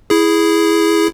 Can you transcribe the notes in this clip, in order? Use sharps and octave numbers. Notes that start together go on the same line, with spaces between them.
E4 G#4